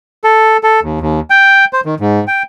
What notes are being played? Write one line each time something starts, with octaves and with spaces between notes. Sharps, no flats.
A4
A4
D#2
D#2
G5
C5
D#3
G#2
G5